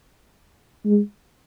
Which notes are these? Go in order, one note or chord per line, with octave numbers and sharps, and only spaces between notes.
G#3